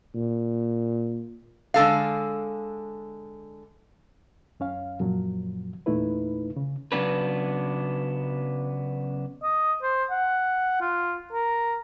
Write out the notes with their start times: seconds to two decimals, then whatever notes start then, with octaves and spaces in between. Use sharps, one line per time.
0.15 A#2
1.74 D3 G#3 A4 F5
4.60 F#2 C#4 F5
5.00 F#2 A#2 F3 F#3
5.86 E2 A#2 A3 D#4 E4 B4
6.57 C#3
6.92 C#3 F#3 B3 D4 B4
9.43 D#5
9.82 C5
10.11 F#5
10.81 F4
11.33 A#4